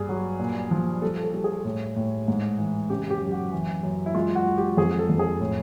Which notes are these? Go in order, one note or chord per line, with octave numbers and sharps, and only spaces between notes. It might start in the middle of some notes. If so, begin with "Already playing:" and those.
Already playing: G2 G#4
F#3
A#2
F3
G3 A4
A4
G3
G#4
A2
A2
G#2
E3
C#3 G4
G4
F#2
F#4
E3
F#2
E4
G#3 F4
F#4
G#3
G4
F2 G#4
A4
F2
G#4
A2